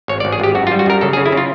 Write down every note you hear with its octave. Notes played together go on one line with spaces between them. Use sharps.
G#1 C#5
D5
G#1
G#4
G#1 G4
F#2 F#4
F4
G3
F#4
F#2 A#4
C#3 A4
G#4
C#3
E4
C#3
F4